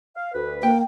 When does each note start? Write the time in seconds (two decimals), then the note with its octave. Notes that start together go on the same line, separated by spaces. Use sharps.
0.16 F5
0.33 D2 B4
0.63 A#3 G5